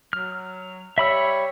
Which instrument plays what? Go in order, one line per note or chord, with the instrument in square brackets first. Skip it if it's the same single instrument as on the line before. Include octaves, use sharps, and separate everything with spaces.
[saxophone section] F#3 [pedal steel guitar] F6
[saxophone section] G3 C#5 [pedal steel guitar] E5 B5 E6